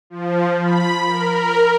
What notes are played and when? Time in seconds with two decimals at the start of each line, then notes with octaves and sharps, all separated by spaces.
0.10 F3
0.63 B5
1.06 A#4